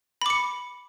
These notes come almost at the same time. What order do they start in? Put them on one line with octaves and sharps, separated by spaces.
B5 D6 C#7